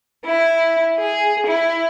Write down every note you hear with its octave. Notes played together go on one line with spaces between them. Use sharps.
E4
G#4
E4